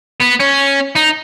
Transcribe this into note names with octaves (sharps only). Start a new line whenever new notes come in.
B3
C#4
D#4